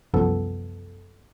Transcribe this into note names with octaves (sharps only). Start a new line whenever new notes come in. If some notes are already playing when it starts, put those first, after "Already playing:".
C2 F#2 F3 B3 A4